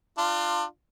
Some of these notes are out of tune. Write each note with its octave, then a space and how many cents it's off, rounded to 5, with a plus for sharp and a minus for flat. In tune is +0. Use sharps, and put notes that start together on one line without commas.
D4 +30 F4 +0